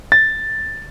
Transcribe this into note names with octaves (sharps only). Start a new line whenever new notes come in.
A6